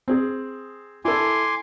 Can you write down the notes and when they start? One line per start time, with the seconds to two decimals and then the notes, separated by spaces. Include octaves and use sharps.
0.08 C4 G#4
1.05 E4 A4 G#5 C6 D6